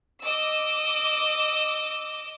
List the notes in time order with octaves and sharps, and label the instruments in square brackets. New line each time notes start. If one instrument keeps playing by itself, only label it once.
[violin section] D#5 D6 E6